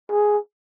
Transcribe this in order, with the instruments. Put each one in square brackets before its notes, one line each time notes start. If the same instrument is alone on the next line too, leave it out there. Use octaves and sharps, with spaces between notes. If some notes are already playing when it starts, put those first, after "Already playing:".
[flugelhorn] G#4